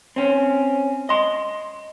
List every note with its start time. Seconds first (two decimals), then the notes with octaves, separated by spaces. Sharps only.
0.16 C4 C#4
1.09 D#5 C6